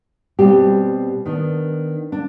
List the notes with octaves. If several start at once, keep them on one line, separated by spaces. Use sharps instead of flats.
B2 G3 C4 G4
D#3 B3 D4
D4